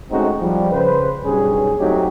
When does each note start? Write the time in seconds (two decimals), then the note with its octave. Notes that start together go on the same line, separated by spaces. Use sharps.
0.11 G#3 A3 C4 C#4 D#4 F#4
0.41 F3 G3
0.71 C#3 B4 C5
1.24 B1 G2 G3 C#4 G#4
1.79 F#3 A3 C4 D#4 G4